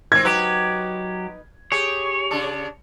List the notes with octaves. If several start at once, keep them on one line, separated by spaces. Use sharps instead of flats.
D#3 C4 G#6
F#3 D#4 G4 B4
G4 G#4 C#5
C#3 D4